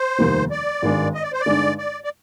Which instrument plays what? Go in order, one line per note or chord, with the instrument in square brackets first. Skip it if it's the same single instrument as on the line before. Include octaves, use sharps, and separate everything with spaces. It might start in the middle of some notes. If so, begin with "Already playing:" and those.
Already playing: [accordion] C5
[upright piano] F1 D#2 D#3 G3
[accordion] D5
[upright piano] G#1 G2 D#3 G#3
[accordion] D#5
D5
C5
D5
[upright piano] G2 D3 G#3 D#4
[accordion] D5
D5